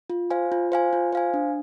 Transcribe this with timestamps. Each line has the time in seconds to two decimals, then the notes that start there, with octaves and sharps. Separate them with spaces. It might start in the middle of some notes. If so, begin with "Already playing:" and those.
0.10 F4
0.31 C5 F5 G#5
0.52 F4
0.72 C5 F5 G#5
0.93 F4
1.13 C5 F5 G#5
1.34 D4